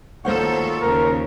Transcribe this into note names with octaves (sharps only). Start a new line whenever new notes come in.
D2 D#3 F3 A#3 A4 C5 C#5 F#5
D#2 C#3 A#4